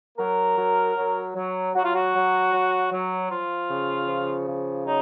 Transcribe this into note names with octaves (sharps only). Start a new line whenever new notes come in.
F#3 A#4
F#3
F#3
F#3
F#3 F#4
F4
F#4
F#3
F#3
F#3
F3 F4
C#3
F3
C#3
F#3 D#4